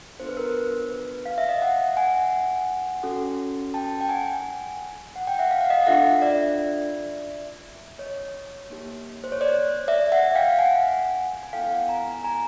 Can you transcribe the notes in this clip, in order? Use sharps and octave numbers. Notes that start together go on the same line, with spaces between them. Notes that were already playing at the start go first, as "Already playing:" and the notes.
B3 D4 F4 A4 C5
B4
A#4 C5
B4
F5
E5
D#5 F5
E5 F#5
F#5 G#5
C#4 F#4 A4
G5 A5
G5
F#5 G#5
F#5
G5
E5 F#5
F5
F#5
D#5 F5
D4 F4 A4 E5 F#5
D5 E5
C#5 D#5
A#3 D#4 G4
C5
C#5
C5 D5
D5 E5
E5 F#5
F5 G5
F#5 G#5
G#5
B3 E4 A4 F5 G5
F#5 G#5
G#5 A#5
G#5 A#5